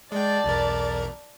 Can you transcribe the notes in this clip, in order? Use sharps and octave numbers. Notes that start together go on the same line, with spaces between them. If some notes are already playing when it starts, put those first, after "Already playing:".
G#3 D5 G5 A5
B1 E2 A#4